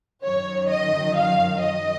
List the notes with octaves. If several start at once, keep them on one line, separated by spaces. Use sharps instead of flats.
F#2 D#3 F#3 C#5
D#5
F5
D#5